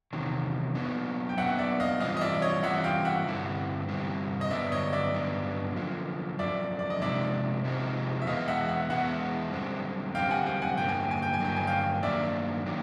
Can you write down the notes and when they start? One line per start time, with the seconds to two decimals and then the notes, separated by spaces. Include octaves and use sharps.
0.13 E2 C3 D#3 F#3
0.75 B2 F#3 B3 D4
1.29 G5
1.38 B2 F#3 B3 D4 E5 F#5
1.59 D5 E5
1.80 D#5 F5
2.00 E3 G3 C4 F4 D#5 F5
2.17 D#5
2.21 D5 E5
2.42 C#5 D#5
2.63 E3 G3 C4 F4 E5 F#5
2.84 F5 G5
3.05 E5 F#5
3.26 G2 D3 G3 C4 E4
3.89 G2 D3 G3 C4 E4
4.41 D#5
4.51 G2 D3 F#3 B3 D4 D5 E5
4.72 C#5 D#5
4.93 D5 E5
5.14 G2 D3 F#3 B3 D4
5.76 F#2 D3 F3
6.39 F#2 D3 F3 D5 E5
6.79 D5
6.90 D#5
7.01 C3 F3 G#3 C4 D#4 D5 E5
7.64 C3 F3 G#3 C4 D#4
8.21 E5
8.27 E2 B2 G#3 B3 E4 D#5 F5
8.48 E5 F#5
8.69 E5 F#5
8.90 E2 B2 G#3 B3 E4 E5 F#5
9.52 F#2 D3 G3 C4
10.15 F#2 D3 G3 C4 F5 G5
10.31 F#5 G#5
10.46 F5 G5
10.62 F#5 G#5
10.77 G2 D3 F#3 A#3 G5
10.89 G#5
11.00 G5
11.11 G#5
11.22 G5
11.34 G#5
11.40 G2 D3 F#3 A#3 G5
11.56 G#5
11.67 F5 G5
12.03 G2 D#3 F#3 A#3 D4 D5 E5
12.66 D#3 F#3 A#3 D4